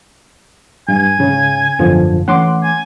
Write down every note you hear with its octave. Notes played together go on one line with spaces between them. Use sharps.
G2 G#5
G#2 C#3
G#1 F#2 B2 D3 F3
E3 A3 C#4 F#5 C6 D6
G#5